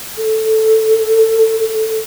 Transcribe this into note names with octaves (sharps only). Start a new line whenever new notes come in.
A4